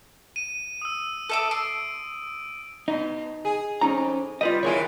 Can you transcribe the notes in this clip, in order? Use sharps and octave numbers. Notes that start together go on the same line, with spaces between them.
D#7
D#6 E6
A4 E5 D6
C6 D7
B2 D#4
G#4
F2 C#4 D#4 A#5
G3 F4 B4 D#5
D#3 E3 E4 F4 G#4 C#5